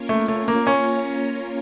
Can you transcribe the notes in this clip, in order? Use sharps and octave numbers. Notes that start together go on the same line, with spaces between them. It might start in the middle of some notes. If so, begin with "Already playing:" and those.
Already playing: A#3 C#4 F4 A#4 C#5
A3
A3
A#3
C#4